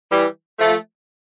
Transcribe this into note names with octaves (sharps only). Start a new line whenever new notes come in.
E3 G3
F3 A3